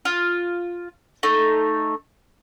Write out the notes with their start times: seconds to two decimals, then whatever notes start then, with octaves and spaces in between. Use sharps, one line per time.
0.05 F4
1.23 A3 D#4